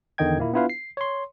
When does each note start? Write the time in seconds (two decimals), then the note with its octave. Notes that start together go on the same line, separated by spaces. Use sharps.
0.18 E2 D3 D#3 D#5 G5 G#6
0.38 A#2 A#3 E4
0.54 B3 D4 E4 F4 B4 F5
0.70 C7
0.97 C#5 C6